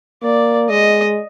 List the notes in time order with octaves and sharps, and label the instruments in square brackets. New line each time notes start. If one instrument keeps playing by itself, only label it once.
[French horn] A#3 [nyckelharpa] D5
[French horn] G#3 [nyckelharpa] D#5